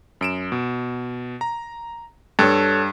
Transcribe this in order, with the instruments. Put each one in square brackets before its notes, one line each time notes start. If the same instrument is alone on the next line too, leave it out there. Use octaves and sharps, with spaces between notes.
[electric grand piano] F#2 D7 E7
B2
A#5
[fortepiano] G2 [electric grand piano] A4 C#5